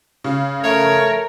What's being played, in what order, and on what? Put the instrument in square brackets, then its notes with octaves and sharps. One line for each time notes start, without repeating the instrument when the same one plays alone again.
[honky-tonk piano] C#3
[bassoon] A3 [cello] A#4 [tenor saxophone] C#5